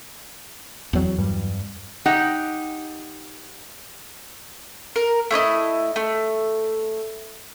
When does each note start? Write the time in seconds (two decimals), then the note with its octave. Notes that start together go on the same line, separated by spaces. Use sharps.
0.93 E2 F#3 C4
1.18 G2 G3
2.06 D#4 G4 F#5
4.96 A#4
5.31 A3 E4 D5 D#5
5.96 A3